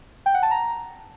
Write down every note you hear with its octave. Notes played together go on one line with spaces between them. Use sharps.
G5
F#5
A5
A#5